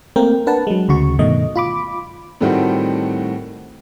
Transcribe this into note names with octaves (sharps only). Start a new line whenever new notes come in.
A3 A#3 C4 A#4 G5
D4 A#4 B4 F#5 A5
F#3 G#3
D2 C#3 F#4 C#6
G2 B2 D#3 A3 D#5
F4 B5 D6
A2 D#3 G3 A3 C4 F#4